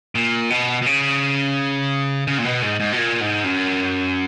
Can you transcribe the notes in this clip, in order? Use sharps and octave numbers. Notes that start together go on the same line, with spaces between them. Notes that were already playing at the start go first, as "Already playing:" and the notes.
A#2
B2
B2
C#3
C#3
A#2
B2
G#2
G#2
B2
A#2
G#2
F#2